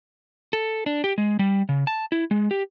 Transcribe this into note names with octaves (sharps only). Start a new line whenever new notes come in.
A4
D4
G4
G#3
G3
C#3
A5
E4
G#3
G4